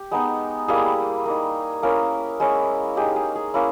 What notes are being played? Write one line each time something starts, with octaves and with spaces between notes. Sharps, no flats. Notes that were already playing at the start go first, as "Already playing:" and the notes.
Already playing: G4
G#3 B3 D#4
G3 A#3 E4 G#4
A#3 D#4
A#3 C#4 E4 A#4
G#3 C#4 E4
G#3 D#4 G4
G#4
G#4
A#3 C#4 E4